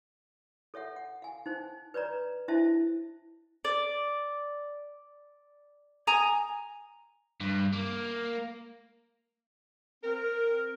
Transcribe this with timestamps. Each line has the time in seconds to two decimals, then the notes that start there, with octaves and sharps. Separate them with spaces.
0.74 A4 C#5 E5 F#5
0.96 F#5
1.22 F5 G#5
1.46 D#4 C5 G#5
1.94 B4 C#5 D5 A#5
2.48 D4 E4 C5 D#5 E5 A5
3.65 D5
6.07 G#5 A#5 D#6
7.40 G2
7.73 A#3
10.04 C4 A#4